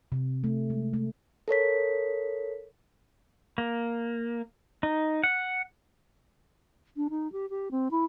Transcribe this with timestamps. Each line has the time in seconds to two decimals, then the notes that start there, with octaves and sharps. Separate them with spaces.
0.12 C3
0.44 A3
0.70 G#3
0.93 A3
1.48 A4 A#4 C#5 B6
3.58 A#3
4.83 D#4
5.24 F#5
6.97 D4
7.10 D#4
7.32 G4
7.50 G4
7.71 C4
7.91 E4